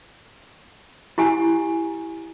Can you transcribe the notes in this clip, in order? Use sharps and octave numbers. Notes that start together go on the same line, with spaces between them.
E4 G4 G#5